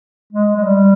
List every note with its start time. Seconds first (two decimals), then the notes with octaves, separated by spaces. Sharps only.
0.33 G#3
0.56 G#3
0.63 G3